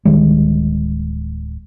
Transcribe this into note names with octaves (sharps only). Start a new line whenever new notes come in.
D1 D#3 G3 G#3